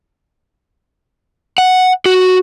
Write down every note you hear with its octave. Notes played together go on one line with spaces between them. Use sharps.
F#5
F#4